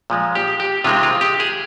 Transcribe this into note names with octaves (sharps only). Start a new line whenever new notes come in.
A#2 F3 G#3
G4
G4
C3 D#3 G#3 C4 F4
F4
G4
G#4